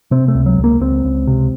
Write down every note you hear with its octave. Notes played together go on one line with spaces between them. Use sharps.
C3 C4
A3
C#2
F#3
C#2
A#3
C#2 C4
C#2
C3